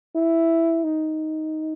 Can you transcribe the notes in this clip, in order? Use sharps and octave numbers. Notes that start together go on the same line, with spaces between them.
E4
D#4